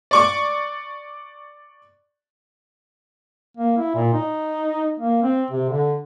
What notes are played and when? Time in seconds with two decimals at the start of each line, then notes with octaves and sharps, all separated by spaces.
0.11 D5 C#6 D6
3.57 A#3
3.78 E4
3.95 A#2
4.13 D#4
5.00 A#3
5.23 C4
5.51 C3
5.69 D3